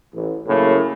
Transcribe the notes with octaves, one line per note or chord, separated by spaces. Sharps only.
A1
F#2 A2 C#3 A#3